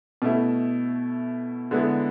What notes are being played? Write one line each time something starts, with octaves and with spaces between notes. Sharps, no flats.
B2 A3 E4
D3 G#3 B3 E4